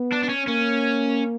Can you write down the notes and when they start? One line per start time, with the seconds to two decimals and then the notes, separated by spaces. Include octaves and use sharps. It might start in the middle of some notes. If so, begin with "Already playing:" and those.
Already playing: B3
0.12 D4
0.23 D4
0.29 C#4
0.47 A#3 C#4